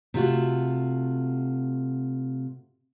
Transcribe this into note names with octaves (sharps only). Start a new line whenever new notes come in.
C3 A3 F4 F#4